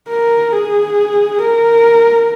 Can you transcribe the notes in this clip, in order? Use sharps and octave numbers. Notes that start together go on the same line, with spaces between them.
A#4
G#4
A#4